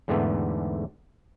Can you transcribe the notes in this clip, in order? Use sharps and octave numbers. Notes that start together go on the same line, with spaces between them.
E2 G#2 D3 A3 B3